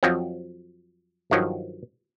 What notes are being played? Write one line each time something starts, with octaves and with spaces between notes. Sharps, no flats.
F2 F3 F#3 C4
G2 D#3 F3 F#3